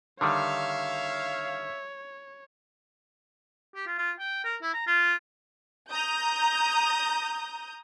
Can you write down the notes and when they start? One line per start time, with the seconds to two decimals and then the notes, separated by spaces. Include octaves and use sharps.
0.21 D3 D#3 G3 C#5 E5 F5
3.75 G4
3.87 F4
3.98 F4
4.19 G5
4.45 A#4
4.62 E4
4.74 A#5
4.87 F4
5.91 A#5 D#6 G6